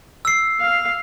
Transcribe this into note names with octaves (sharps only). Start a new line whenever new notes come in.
E6 C7
F5